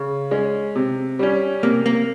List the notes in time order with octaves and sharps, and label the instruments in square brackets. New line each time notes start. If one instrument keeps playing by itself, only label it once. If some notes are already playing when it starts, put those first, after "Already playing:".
Already playing: [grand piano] C#3
G#3 C#4
C3
G3 C#4
[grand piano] C3 [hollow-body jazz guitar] A#3
[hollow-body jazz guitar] A#3